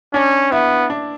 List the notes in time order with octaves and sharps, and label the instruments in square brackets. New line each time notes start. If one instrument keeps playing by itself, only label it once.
[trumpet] C#4 [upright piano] D4
[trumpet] B3 [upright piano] E4
[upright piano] D4